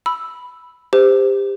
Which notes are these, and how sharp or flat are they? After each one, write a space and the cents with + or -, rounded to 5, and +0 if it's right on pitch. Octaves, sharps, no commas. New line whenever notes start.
B5 +0 E6 +0
G4 +25 C5 -20